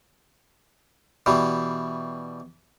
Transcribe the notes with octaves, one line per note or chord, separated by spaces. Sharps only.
B2 E3 G3